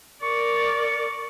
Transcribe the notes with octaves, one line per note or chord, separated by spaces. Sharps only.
A#4 D5 C#6